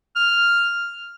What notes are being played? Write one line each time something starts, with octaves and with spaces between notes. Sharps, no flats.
F6